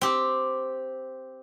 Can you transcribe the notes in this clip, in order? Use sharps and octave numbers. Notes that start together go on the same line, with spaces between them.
C4 G4